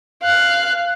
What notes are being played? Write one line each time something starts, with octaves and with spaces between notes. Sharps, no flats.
F5 F#6